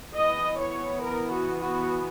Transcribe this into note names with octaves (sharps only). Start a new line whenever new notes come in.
E3 B3 D#5
C#5
A#4
F#4
F#4